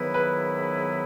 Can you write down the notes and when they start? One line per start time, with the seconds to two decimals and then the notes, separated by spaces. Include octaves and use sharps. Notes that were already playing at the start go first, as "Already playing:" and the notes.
Already playing: G#2 D#3 F#3 B3 E4 B4
0.14 B4